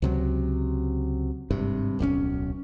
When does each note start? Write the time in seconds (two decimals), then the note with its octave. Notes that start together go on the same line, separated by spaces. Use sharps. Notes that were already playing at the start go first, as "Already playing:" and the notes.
0.02 C#2 C3 F#3
1.51 G#1 G2 C3
1.99 D1 B1 C3 C#4